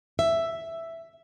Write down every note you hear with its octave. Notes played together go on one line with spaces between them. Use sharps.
E5